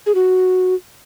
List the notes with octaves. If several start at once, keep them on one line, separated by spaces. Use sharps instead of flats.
G#4
F#4